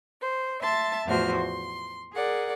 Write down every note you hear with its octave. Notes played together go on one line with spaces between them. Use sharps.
C5
E5 A5 C6 A6
E2 A2 F3 F#4 C5 F6
C6
G#4 A#4 D5 F#5